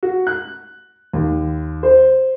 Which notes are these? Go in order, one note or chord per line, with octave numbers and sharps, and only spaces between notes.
F#4
F#6
D#2
C5